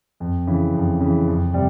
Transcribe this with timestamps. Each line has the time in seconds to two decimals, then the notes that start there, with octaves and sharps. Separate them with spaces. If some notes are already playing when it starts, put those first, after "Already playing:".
0.20 F2
0.47 C#3 E3
0.74 F2
1.00 C#3 E3
1.28 F2
1.54 C3 G3